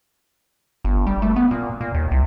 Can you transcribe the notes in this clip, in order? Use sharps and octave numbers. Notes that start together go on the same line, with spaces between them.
G1
G3
A3
B3
A#2
A#2
D#2
C2